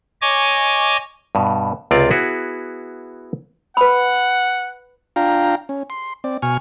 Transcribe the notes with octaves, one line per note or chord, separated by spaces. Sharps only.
C#5 D#5 G#5 C#6 D6
G2 B2
C#2 C3 C4 F4 D5 F5
B3 E4 F#4 G#4
B4 F#5 B5
D4 F4 F5 G5 A#5
C#4
C6
C4 D5
B2 G#5 C#6 F6